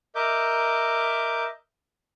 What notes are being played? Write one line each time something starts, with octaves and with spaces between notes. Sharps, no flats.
A#4 D#5 E5 D6 G6